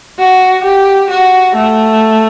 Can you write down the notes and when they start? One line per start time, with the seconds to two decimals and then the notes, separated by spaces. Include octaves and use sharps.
0.19 F#4
0.64 G4
1.10 F#4
1.55 A3